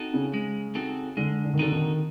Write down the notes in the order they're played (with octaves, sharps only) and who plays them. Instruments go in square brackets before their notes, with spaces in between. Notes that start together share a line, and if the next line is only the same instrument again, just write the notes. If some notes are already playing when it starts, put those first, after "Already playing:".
Already playing: [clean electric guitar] C4 D#4 F#4 A4
[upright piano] C#3
[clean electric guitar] G#3
C4 D#4 F#4 A4
[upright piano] D3 [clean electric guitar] G#3
[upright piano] D3
D#3
[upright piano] D3 [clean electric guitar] C4 D#4 F#4 A4
[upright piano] D#3